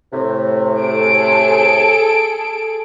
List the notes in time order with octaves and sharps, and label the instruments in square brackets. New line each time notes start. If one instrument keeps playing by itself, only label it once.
[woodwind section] A2 C3
[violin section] G#4 A4 D7